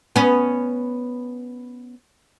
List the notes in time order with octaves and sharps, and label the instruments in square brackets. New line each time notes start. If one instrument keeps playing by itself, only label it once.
[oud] B3 C#4